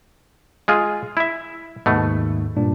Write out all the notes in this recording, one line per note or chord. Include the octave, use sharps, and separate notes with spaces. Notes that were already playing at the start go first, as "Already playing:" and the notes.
G#3 F4 G#4
E4 E5
D#2 G#2 B2 A3
G2 A#2 D4